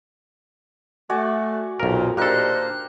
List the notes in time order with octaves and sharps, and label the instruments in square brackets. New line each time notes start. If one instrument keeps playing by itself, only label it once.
[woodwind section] A3 [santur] F#4 D5 G#5
[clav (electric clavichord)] B1 A#4 [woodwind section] F2 A#2
[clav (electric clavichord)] A#2 A4 [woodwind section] D#3 D4 C5 [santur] G4 A#4 [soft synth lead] F#6